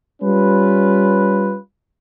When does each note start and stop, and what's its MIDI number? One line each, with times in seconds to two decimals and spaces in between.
0.22 1.58 55
0.22 1.58 61
0.22 1.58 65
0.22 1.58 71